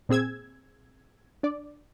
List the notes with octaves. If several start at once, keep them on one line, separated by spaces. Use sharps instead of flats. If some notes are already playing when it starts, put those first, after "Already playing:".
A#2 C4 G#4 E6 G#6
D4 D5